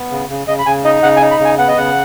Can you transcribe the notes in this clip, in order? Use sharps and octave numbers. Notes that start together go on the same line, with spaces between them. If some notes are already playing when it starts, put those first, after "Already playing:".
Already playing: B3
C#3
C#3
C#3 D#5
B5
C#3 G#5
D#4 D#5
C#3 F#5
G#5
D#4
B5
C#3
G#5
B3 F#5
D#5
C#3 F#5